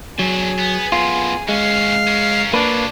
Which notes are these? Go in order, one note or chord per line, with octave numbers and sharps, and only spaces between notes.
E2 F#3 D4 G#4
B3
F#2 A2 B3 F4
D#2 G#3 C#4 F5
C#4 A#4
F#3 A#3 D4 F4 B4